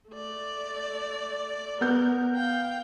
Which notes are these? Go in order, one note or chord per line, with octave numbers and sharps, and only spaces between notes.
A3 D5
B3 A#4 G6
F5 G5